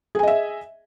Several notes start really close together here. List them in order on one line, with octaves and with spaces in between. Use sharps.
G#4 G#5 D#5 E5